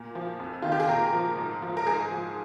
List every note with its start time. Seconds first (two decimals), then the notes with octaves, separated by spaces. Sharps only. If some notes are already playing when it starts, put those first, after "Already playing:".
Already playing: A#2
0.15 F3
0.40 F2
0.62 D#3 F4
0.72 G4
0.80 G#4
0.89 A#2 A#4
1.13 F3
1.37 G#2
1.62 F3
1.77 A#4
1.87 G#2 G#4
2.11 F3